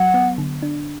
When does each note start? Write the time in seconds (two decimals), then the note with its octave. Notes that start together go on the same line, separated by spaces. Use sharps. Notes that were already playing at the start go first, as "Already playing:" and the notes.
Already playing: F#3 F#5
0.14 B3
0.38 D3
0.62 D4